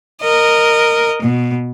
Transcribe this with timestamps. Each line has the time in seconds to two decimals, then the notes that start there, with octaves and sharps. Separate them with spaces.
0.21 A#4 D#5
1.22 B2